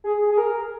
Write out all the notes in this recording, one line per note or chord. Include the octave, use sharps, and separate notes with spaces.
G#4
G#4
A#4